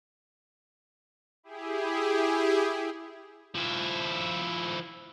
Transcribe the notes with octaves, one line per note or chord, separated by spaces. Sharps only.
E4 G4 G#4
F3 E4